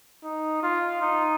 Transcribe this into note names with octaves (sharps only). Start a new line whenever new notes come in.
D#4
F4
D#4